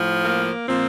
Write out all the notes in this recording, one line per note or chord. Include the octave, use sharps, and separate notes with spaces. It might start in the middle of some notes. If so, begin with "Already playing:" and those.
Already playing: A2 F3
A#3
A#2 F3 C4